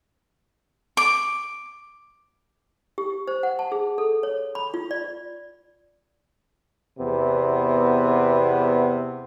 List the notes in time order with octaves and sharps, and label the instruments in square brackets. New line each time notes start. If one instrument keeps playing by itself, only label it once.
[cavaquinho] D6
[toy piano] G4
C5
F#5
A5
G#4
A4
C#5
B5
F4
D5
[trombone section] E2 C3 B3